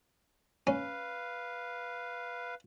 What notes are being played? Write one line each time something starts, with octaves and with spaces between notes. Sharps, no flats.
C#4 B4 F5